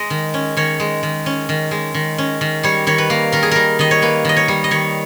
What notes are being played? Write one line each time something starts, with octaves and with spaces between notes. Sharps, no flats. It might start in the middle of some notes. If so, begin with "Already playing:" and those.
Already playing: G#3 D#5
D#3
C#4
D#3 C#5
G#3
D#3
C#4
D#3
G#3
D#3
C#4
D#3
G3 C#5
D#3 C#5
B4
A#3
D#3 A#4
G#4
G3 A#4
D#3 D#5
C#5
A#3 B4
D#3 D#5
C#5
G3
D#5
D#3 C#5